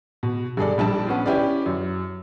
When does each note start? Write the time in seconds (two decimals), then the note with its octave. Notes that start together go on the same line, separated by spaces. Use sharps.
0.23 B2
0.57 G2 G#4 A4 D5
0.78 A#1 G3 D4 A5
1.07 B3 C#4 F4
1.26 C#4 E4 G4 B4 D5
1.66 F#2